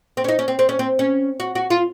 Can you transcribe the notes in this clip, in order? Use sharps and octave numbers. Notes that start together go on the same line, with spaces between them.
C4
C#4
D#4
C#4
C4
C4
C#4
C4
C#4
F#4
F#4
F4